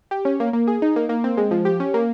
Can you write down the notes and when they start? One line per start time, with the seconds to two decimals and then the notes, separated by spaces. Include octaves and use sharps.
0.11 G4
0.25 C#4
0.40 A#3
0.53 A#3
0.67 G#4
0.82 D#4
0.96 A#3
1.09 A#3
1.24 C4
1.37 G#3
1.51 F3
1.65 G4
1.80 C#4
1.94 A#3